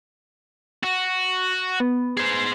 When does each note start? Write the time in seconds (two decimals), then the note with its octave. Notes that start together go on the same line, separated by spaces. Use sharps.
0.83 F#4
1.80 B3
2.17 G#4 C5